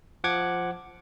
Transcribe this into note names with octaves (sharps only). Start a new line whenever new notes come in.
F3 F#5 D6 G#6